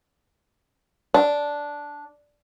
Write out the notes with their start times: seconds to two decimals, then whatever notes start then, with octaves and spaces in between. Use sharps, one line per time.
1.14 D4